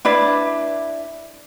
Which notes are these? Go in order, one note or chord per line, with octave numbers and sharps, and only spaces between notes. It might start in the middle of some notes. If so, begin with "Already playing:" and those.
D4 E4 B4 D5